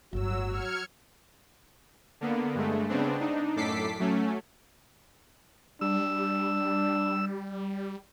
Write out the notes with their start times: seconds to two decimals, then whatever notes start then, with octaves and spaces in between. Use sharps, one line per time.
0.13 G1 A2 F#3 F#4 E6
0.48 F6 G#6 C#7
2.21 D3 A#3 B3
2.55 G2 G#3 A3
2.89 C#3 B3 C4 D4
3.19 D4 D#4
3.56 F#2 A2 A4 D6 B6 C7
4.00 F#3 A3 C#4
5.81 G3 D4 E6